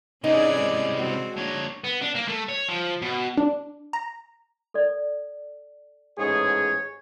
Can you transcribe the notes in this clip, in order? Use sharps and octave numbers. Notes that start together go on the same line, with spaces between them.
C3 E3 C#4 D#4 G#4 D5
G#3
C4 F#4
A#3 D4 C#5
B3
D4
A#3
A3
C#5
F3
B2
D4
A#5
A4 D5
A1 G#2 G#4 C#5